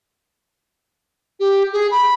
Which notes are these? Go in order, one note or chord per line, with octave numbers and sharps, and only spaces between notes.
G4
G#4
B5